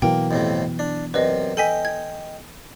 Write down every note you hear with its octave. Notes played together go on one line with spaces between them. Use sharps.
B2 E3 F#3 A#3 G5
F2 A2 C3
D4
F#2 C3 B4 D5 D#5
A4 D#5 G5 G#5 B6
G#6